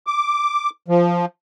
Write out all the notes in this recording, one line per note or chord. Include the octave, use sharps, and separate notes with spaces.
D6
F3